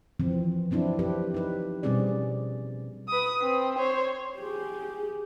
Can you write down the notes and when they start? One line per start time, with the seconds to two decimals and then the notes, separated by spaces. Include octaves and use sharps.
0.20 E3 F3 C4
0.71 F#3 C4 D4 E4
0.99 C4 D4 G4 B4
1.34 D#4 B4
1.83 B2 G3 C4 C#4 G#4 D5
3.08 B4 D#6
3.42 C4
3.78 C5 C#5
4.37 G4 G#4